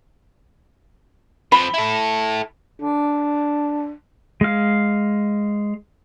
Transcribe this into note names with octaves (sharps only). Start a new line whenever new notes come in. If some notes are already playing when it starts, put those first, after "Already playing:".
F3 C4 B5
E4 A4
D4
G#3 F5